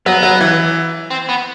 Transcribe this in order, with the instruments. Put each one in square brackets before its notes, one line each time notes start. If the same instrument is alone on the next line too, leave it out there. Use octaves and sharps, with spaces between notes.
[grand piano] F#3 [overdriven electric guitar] B3
[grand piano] F#3
E3
[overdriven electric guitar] C4
B3